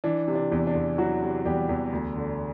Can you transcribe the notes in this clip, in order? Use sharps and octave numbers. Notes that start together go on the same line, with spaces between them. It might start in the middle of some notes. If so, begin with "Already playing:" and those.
E3 D4
C3
D4
E2
D4
E2
E3 F#3 F#4
C3
E2 G3 G4
E2
D2
D3